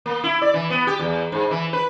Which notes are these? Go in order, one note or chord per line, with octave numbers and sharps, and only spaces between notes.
A#3
E4
D5
E3
B3
G4
E2
G#2
E3
B4